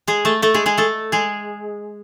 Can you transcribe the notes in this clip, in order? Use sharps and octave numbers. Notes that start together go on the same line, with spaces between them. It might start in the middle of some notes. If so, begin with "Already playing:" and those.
G#3 G#4
A3 A4
A3 A4
G#3 G#4
G#3 G#4
A3 A4
G#3 G#4